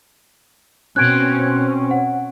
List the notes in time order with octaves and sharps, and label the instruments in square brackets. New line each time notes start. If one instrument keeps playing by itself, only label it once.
[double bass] B2 [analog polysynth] C4 C#4 [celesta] F#6 G#6 D7
[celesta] F#5